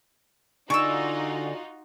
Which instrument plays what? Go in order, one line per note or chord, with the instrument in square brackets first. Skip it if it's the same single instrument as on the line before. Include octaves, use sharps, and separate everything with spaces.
[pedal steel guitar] D3 G#4 D5 [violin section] D#4 F4 F#4 [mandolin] C#6 E6